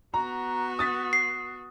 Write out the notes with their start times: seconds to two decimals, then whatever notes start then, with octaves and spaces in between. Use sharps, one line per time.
0.14 B3 F#4 A#5
0.79 D#6 A6 B6
1.13 C7